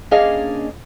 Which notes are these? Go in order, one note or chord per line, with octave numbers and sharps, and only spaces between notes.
A#3 C#4 D4 G#4 D#5 F5